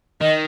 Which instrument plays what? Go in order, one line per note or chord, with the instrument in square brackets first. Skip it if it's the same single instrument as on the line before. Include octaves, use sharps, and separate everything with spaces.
[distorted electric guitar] D#3 [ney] D#5